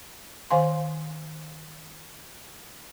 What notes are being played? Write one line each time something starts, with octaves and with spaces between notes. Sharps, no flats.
D#3 C5 F5 G#5 C6